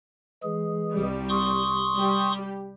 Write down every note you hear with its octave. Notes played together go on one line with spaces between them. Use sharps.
E3 G#3 G#4
C2 G3
C6 C#6 D#6
G3 G4